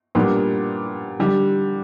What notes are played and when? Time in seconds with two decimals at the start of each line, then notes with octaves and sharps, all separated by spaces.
0.15 A#2 G3 B3 D4
1.19 D3 G3